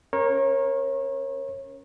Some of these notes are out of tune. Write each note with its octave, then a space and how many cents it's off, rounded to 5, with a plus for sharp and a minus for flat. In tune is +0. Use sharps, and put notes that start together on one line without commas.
C#4 +0 A#4 +10 C#5 -30